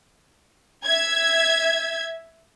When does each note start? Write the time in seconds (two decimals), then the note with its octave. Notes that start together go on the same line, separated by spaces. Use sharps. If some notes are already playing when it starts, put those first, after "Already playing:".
0.86 E5 G#6